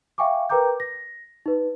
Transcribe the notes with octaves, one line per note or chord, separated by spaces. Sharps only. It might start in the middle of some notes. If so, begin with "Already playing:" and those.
E5 F5 G5 G#5 C#6 D6
A#4 B4 G5 A#5 D6 G6
A#6
D#4 B4